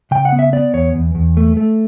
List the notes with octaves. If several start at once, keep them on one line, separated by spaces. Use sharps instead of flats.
C#3 G5
F#5
B3
E5
B3 D5
E2 C#5
E2
E2
A3
A3